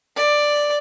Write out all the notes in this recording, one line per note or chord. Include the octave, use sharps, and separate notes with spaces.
D5